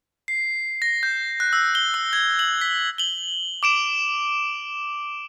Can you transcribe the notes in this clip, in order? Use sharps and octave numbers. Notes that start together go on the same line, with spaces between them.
C7
A#6
G6
F#6
E6
G7
E6
G#6
F#7
B6
F#7 G7
D6 D7 E7